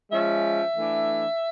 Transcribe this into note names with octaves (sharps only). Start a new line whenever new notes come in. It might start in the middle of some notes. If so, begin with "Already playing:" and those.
F3 G#3 C#4 E5
E3 A3 D4